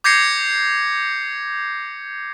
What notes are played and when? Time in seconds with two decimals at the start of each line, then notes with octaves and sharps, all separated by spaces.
0.04 D6 G6 G#6 A#6 C7 C#7